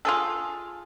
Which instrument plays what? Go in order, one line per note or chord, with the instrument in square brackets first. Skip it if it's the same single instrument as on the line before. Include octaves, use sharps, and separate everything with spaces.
[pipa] F4 G#4 A4